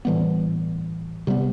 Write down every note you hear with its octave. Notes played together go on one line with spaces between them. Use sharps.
A2 E3 G3 B3
C3 G3 B3